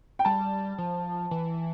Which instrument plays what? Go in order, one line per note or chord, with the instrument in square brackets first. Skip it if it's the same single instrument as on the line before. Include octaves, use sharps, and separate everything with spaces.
[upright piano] G5
[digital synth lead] G3 [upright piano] A5
[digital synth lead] F3
E3